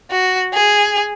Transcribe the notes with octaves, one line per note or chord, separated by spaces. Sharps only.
F#4
G#4